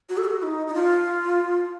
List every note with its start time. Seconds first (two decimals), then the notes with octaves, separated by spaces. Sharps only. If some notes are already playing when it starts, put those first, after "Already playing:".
0.09 F#4
0.17 A4
0.24 F#4
0.42 D#4
0.67 D#4
0.74 F4